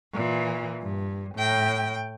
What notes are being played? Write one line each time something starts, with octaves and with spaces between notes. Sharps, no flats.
A#2 E3
G2
A2 G5